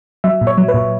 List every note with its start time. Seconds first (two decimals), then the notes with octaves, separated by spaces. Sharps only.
0.24 F#3 E5
0.41 A#2
0.47 C#5
0.58 F#3
0.68 B4
0.74 A#2